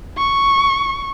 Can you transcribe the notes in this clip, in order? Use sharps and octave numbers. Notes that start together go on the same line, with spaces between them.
C#6